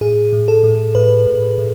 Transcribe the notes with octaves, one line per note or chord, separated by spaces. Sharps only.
A2 G#4
A2
A4
A2
A2 B4
A2
A2